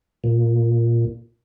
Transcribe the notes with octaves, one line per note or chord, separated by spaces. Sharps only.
A#2